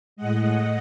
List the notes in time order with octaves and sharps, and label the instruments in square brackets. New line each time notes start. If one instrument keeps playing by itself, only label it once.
[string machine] A2 G#3 D#5 F#5